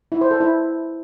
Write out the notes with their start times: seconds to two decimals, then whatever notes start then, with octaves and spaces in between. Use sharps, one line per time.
0.12 E4
0.21 C5
0.31 A4
0.40 E4